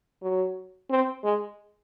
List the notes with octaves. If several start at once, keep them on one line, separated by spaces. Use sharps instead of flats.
F#3
C4
G#3